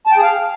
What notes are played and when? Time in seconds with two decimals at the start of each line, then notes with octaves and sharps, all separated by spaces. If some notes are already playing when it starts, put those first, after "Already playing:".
0.07 A5
0.12 G5
0.17 G#4
0.23 F5